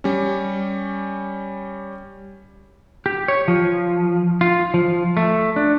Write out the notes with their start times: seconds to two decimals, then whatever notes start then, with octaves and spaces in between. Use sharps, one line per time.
0.04 G3 C#4
3.06 G4
3.28 C#5
3.48 F3
4.41 F4
4.74 F3
5.17 A3
5.56 D4